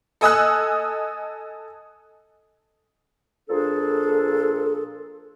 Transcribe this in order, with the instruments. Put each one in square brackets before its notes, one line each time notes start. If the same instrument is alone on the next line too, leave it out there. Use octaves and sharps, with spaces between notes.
[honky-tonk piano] A4 D#5 G#5 D#6 E6 F#6
[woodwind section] A#2 F3 D4 G#4 A4